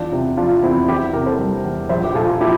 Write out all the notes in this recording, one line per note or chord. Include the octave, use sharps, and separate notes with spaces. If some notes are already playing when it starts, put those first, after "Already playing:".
Already playing: E2 D4 F4
C3
F3 D4 F4
E2 C4 E4
E2 E4 G4
C3 G4 A#4
A4 C5
G3
E2
A#1 C5 E5
G4
A#2 F4 A4
F3 E4 G4